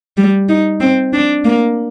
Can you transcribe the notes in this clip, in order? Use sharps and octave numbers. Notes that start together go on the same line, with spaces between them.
G3
D#4
C4
D4
A#3